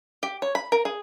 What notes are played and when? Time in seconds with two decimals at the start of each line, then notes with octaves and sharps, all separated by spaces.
0.23 G4
0.42 C#5
0.55 B5
0.72 A#4
0.85 G#4